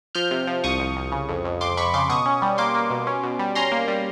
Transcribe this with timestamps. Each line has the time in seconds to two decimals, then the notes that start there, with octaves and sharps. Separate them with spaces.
0.15 F3 F6 G6
0.31 C3
0.47 F3
0.64 C2 C#6 D#6
0.80 C2
0.96 C2
1.12 C#3
1.29 F2
1.45 F2
1.61 F2 C6 D6
1.77 F2 B5 C#6
1.94 C#3 C6 D6
2.09 B2 C#6 D#6
2.26 C#4
2.42 G3
2.58 A#3 C6 D6
2.75 A#3
2.91 B2
3.07 C#4
3.23 B2
3.39 G3
3.55 C#4 A#5 C6
3.72 A#3
3.88 G3